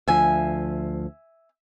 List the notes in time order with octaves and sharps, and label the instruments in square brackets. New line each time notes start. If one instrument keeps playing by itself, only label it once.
[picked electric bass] D2 F3 [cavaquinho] E5 G#5